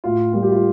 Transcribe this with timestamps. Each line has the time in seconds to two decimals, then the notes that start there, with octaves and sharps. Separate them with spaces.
0.04 A2 F4
0.33 G3 A#3 F4
0.42 G4
0.52 F4